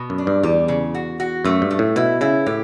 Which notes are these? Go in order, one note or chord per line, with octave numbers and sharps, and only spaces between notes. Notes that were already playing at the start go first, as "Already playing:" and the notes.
Already playing: B2
F#2
D4
G2
E2 G3
C#3
F#4
F#4
F#2 A3
G2
A3
A2
B2 E4
C#3 E4
A2 G4